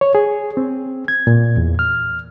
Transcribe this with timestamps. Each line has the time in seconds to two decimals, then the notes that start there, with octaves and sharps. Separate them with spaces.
0.01 C#5
0.15 G#4
0.57 C4
1.08 G#6
1.27 A#2
1.57 E2
1.79 F6